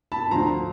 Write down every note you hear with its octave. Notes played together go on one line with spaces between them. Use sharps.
A5 B5
D2 D3 F3 A#5 C6